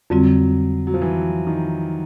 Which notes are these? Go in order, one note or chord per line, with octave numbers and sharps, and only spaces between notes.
F2 D3 F#3 G3 C4 F4
F#3
F3
E3
D#3